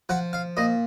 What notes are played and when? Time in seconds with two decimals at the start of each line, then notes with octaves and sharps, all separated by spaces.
0.09 F3 F#5
0.33 F5
0.57 A#2 D#5